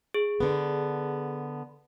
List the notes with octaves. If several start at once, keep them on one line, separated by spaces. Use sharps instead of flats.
G#4
D3 B3